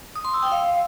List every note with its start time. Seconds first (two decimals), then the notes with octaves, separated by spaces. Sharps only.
0.16 D#6
0.25 C6
0.34 E6
0.43 G5
0.52 F5